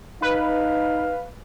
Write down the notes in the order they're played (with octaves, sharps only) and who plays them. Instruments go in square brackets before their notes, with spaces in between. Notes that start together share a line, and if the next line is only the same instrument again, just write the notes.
[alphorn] D#4 [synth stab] B4 [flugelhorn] F5